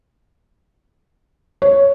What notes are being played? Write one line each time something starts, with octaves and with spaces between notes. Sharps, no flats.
C#5